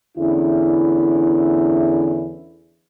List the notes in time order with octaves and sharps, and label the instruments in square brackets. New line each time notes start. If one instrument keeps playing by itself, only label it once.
[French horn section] E2 D3 C#4 E4